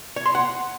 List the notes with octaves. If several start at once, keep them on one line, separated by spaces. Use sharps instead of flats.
C#5
C6
F#5